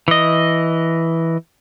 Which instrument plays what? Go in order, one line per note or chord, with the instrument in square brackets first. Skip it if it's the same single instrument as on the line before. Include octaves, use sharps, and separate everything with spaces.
[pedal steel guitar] E3 D#5